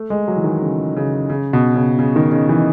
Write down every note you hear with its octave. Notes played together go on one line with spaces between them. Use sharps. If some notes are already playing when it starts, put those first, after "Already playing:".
Already playing: A3
G#3
F#3
E3
D#3
C#3
C#3
C#3
B2
C#3
C#3
D#3
C#3
E3